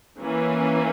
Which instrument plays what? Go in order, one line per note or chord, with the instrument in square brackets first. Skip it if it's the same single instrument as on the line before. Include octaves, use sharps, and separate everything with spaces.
[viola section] E3 A#3 C#4